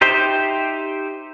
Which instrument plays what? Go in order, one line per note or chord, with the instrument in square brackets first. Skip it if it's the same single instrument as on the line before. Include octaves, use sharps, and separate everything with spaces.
[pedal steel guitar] D#4 G4 C5 E5 G5